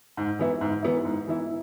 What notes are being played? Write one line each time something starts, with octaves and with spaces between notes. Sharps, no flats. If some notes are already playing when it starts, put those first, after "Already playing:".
G#2
E3 B3 E4
G#2
E3 B3 E4
G#2
E3 B3 E4